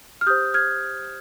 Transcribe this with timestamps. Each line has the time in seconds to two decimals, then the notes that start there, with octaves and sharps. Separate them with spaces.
0.21 F6
0.27 G4 C5 D#6 G6
0.54 F6 G#6